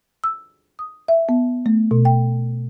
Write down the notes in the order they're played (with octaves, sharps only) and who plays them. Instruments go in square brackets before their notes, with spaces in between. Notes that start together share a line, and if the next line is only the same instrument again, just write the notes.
[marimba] E6
D#6
E5
B3
A3
B2
G5